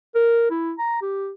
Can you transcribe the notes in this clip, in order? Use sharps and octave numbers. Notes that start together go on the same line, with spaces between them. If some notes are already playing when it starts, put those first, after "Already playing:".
A#4
E4
A#5
G4